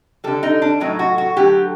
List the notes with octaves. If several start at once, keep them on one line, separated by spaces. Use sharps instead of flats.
D3 G3 A4
D#4
D4
A2 F#3 A3 D#4
F#4
F#4
D3 F#3 A3 G4